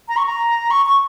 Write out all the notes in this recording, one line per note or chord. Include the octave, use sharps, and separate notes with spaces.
A#5
C#6
A#5
C#6
C#6